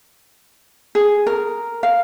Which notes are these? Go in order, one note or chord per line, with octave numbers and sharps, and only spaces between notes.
G#4
A#4
F5